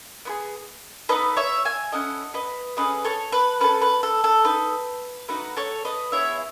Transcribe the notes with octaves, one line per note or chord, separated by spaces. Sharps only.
B3 E4 G#4
B3 D#4 A4 B4 D#5
C#5 E5
E5 G#5
C#4 E4 A4 D#5 F#5
B4 D#5
A3 C#4 G#4 B4 D#5
A4 C#5
B4
C#4 F#4 A4 B4
B4
A4
A4
D#4 A4 B4
A3 D#4 F#4 B4
A4 C#5
B4 D#5
B3 E4 G#4 C#5 E5